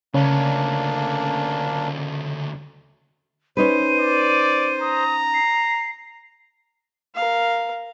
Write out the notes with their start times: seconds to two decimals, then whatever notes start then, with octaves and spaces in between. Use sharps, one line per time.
0.14 D2 C#3 A#3 C#4 D4
3.57 C#4 D#4 B4 C5 D#7
4.00 D5
4.81 A#5 D#6
5.34 C7
7.15 A#4 F5